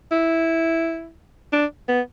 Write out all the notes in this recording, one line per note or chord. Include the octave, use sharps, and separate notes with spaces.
E4
D4
B3